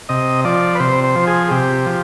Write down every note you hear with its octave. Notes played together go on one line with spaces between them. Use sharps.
C3 D#5
F3 D5
B4
C3 C5
C5
F3
G#4
C3 G4
F3